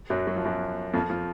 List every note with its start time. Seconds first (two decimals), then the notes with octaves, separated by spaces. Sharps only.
0.10 F#2 F#3
0.27 F#3
0.36 F3
0.45 F#2 F#3
0.94 F2 F3
1.10 F3